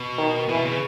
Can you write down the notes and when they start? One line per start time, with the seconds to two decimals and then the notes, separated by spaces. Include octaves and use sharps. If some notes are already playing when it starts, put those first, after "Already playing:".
Already playing: B2
0.18 D#3
0.49 B2 E3
0.65 C#3